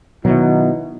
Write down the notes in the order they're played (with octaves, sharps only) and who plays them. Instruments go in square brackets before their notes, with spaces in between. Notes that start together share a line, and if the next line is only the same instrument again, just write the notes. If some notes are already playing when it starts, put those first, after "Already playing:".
[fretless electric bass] B2 F#3 [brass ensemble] D#3 D#4 E4